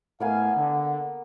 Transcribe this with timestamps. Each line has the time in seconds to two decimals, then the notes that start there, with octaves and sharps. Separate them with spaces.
0.20 A2 A#3 B3 F5 G#5 D6
0.56 D3